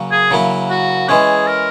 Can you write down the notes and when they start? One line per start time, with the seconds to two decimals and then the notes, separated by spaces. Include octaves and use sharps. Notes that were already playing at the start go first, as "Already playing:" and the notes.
Already playing: C#3 F#3 A#3
0.11 G#4
0.31 C#3 F#3 A#3 E4
0.70 F#4
1.09 E3 G#3 C#4 G#4
1.47 A#4